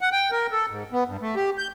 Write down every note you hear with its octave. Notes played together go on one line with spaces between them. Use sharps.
F#5
G5
A#4
A4
G#2
B3
G2
A3
G4
G6